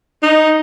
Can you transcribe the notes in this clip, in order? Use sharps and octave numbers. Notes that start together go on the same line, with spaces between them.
D#4